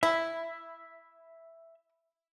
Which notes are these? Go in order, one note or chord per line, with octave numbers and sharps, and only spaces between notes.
E4 E5